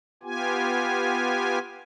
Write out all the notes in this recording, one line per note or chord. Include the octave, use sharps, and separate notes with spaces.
B3 F4 G4 G#5